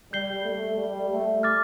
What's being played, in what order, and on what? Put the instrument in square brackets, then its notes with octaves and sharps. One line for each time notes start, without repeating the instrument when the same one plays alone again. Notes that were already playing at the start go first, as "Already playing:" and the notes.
[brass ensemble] G3 [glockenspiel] G6 C7 G7
[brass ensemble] A3
G3
A3
[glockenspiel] D6 F6 A6